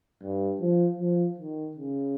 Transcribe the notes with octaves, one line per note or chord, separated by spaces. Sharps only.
G2
F3
F3
D#3
C#3